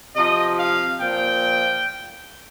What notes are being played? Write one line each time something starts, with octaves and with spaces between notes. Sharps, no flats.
C3 F3 D#5
F5
A#2 F3 G5